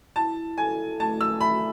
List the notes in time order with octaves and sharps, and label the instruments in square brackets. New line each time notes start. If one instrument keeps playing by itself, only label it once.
[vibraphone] E4 [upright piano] A5
[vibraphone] A4 [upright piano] G#5
[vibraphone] A3 [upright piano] A5
[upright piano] E6
[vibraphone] E5 [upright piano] B5